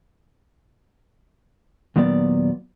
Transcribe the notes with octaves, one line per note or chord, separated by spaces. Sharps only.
D#2 A#2 F#3 B3 D5